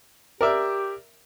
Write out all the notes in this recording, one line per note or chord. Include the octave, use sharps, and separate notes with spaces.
G4 A#4 D5 E5